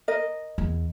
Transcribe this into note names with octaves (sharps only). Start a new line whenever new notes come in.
A#4 D#5
E2